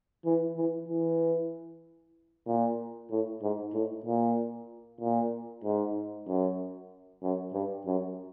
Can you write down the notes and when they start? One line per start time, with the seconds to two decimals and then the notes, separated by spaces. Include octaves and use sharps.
0.25 E3
0.57 E3
0.88 E3
2.47 A#2
3.11 A2
3.42 G#2
3.74 A2
4.05 A#2
5.01 A#2
5.64 G#2
6.28 F#2
7.23 F#2
7.54 G2
7.86 F#2